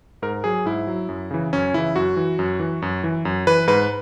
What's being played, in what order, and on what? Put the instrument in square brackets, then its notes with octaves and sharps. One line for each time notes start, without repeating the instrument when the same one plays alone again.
[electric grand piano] G#2 A#4
F#3 G#4
G#2 E4
F#3
F#2
C#3 E3
F#2 C#4
C#3 E3 E4
F#2 F#4
E3
F#2
E3
F#2
E3
F#2
E3 B4
G#2 B4